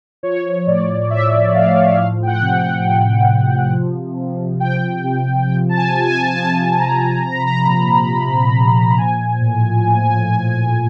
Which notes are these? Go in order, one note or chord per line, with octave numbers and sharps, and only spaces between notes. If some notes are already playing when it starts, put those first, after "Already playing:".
F3 C#5
A2 D5
F3 E5
A2 F5
F3 F5
G5
F#5
C3
F#5
F3
C3
F3
C3
F3 G5
C3
F3 G5
A5
G#5
C3
G#5
A5
G#5
F3 A5
A5
C3 A#5
F3 A#5
B5
A#5
A#2
F3
A#2
F3 G#5
A2